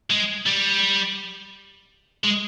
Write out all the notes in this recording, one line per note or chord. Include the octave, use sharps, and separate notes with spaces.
G#3
G3
G#3